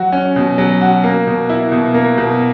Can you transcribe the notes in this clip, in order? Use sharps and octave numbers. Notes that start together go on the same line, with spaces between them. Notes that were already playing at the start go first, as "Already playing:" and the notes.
Already playing: F#3 F#4
C#4
B2
F#3
F#4
A#3
B2
E4
B2
A#3
B2